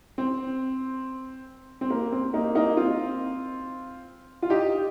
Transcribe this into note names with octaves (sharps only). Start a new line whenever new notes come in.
C4
C4
A#3
C4
A#3 D#4
A#3 D#4
C4 F4
F4
D#4 G4